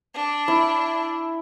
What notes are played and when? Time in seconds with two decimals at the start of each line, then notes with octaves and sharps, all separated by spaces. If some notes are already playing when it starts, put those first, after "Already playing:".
0.14 D4
0.48 E4